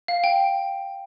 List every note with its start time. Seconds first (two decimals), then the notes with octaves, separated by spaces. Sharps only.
0.08 F5
0.24 G5